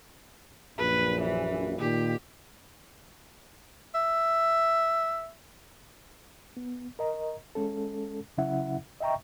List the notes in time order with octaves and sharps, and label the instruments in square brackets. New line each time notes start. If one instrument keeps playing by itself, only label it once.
[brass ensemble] A#1 F#2 [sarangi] B4
[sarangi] E3
[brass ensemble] A#2 D#3 [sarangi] G4
[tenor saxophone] E5
[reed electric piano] B3
A#4 D#5 A#5
G#3 C#4 A4
C#3 F#3 C#4 E4 E5 F#5
D#5 E5 G5 A#5 C#6